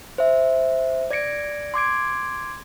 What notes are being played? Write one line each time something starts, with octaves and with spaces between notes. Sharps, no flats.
C5 E5
D5 G#6 A#6 C#7 D7
C6 D6 G#6 D7